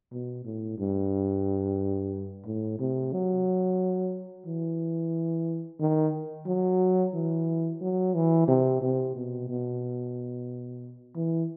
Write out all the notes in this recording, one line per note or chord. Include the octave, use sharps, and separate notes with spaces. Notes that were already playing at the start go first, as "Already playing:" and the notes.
B2
A2
G2
A2
C3
F#3
E3
D#3
F#3
E3
F#3
E3
C3
C3
B2
B2
E3